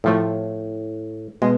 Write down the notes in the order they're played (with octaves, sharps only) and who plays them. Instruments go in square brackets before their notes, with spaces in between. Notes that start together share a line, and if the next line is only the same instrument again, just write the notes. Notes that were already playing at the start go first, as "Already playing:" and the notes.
[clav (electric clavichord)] A2 [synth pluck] C3 F3 A3
[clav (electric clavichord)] B2 [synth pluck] G#3